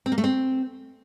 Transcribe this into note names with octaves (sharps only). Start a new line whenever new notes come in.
C4
A#3
A3
C4